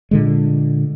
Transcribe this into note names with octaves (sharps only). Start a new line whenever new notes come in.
A#2 D3 G#3